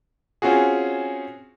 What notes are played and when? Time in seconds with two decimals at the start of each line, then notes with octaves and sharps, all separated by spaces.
0.42 C4 C#4 F4 F#4 G#4